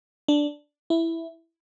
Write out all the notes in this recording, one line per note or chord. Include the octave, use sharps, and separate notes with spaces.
D4
E4